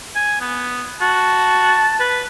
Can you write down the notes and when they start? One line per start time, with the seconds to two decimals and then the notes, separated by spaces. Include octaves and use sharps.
0.15 G#5
0.41 B3
1.01 F#4 A5
2.00 B4